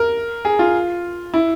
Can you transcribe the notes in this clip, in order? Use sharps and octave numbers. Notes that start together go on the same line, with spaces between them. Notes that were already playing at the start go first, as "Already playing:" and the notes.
Already playing: A#4
G#4
F4
E4